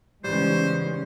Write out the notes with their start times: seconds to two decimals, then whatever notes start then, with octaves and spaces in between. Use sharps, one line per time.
0.24 G#2 C#3 E3 G3 G#3 B3 C#4 C5